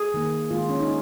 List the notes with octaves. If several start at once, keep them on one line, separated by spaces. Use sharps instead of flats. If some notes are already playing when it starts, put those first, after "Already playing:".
Already playing: G#4
D#3 A#3
D#3 G#3 F4
C#4
D#4